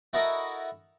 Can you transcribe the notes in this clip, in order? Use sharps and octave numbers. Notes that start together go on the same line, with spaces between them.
E4 F#4 A4 A#4 D#5 E5